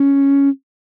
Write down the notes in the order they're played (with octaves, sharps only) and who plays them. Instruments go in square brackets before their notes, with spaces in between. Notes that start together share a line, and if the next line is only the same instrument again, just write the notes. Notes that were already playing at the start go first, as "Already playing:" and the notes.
Already playing: [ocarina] C#4